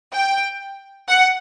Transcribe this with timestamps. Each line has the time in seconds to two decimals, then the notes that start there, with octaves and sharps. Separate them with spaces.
0.13 G5
1.08 F#5